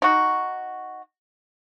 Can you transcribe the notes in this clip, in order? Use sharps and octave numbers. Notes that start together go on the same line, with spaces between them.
D#4 F#4